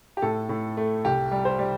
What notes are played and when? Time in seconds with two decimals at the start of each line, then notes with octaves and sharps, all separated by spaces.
0.17 G4
0.22 A2 A4
0.49 A2
0.77 A3
1.05 C2 G4
1.32 G3
1.45 C5
1.59 G3